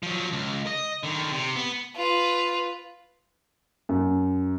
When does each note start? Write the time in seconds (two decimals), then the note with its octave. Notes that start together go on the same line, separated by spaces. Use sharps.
0.03 F3 F#3
0.32 C#2
0.67 D#5
1.03 D3 D#3
1.32 C3
1.56 B3
1.96 F4 B4
3.89 F#2